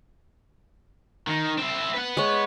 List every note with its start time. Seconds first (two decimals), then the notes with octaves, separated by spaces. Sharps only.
1.27 D#3 D#4
1.58 C4 E4
1.94 B4 F#5
2.17 G#3 C#5